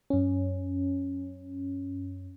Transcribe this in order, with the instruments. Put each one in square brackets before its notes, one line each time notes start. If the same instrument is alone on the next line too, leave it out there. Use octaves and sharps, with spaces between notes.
[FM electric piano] F#2 C#4